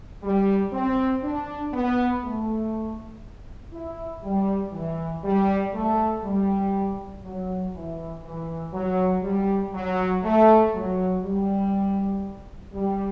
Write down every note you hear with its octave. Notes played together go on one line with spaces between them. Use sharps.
G3
C4
D4
B3
A3
E4
G3
E3
G3
A3
G3
F#3
E3
E3
F#3
G3
F#3
A3
F#3
G3
G3